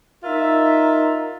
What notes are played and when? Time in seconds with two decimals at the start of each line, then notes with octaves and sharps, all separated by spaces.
0.24 D#4 F4 A#4 E5